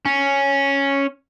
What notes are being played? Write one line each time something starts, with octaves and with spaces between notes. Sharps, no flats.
C#4